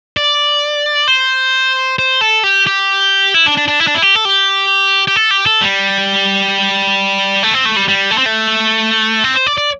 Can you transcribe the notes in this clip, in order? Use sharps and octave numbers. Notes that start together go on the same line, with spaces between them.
D5
C5
C5
A4
G4
G4
E4
D4
D4
D4
E4
D4
E4
G4
A4
G4
G4
A4
G4
A4
G3
A3
C4
A3
G3
G3
A3
C4
A3
C4
C5
D5
D5